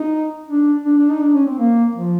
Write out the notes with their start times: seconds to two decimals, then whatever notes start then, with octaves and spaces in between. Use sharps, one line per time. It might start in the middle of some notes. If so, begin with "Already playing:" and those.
Already playing: D#4
0.48 D4
0.85 D4
0.98 D4
1.09 D#4
1.21 D4
1.34 C#4
1.46 C4
1.58 A#3
1.95 F3